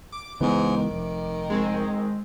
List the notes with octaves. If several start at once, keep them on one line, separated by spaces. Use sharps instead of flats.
D6
C#2 G#2 E3 B3
D#3
F1
G#3 C4